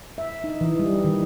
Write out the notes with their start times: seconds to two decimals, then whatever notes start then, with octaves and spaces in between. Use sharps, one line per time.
0.18 E5
0.44 D#4
0.61 E3
0.79 G3
1.04 D#3